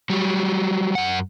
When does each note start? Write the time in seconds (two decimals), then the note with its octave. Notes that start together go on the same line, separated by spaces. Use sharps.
0.10 F#3 G3
0.95 F#2 F#5